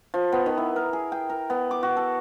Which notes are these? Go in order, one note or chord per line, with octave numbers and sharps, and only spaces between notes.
F3
B3
D#3
E4
A#4
G#4
G5
A#4
B3
D6
F#4
A4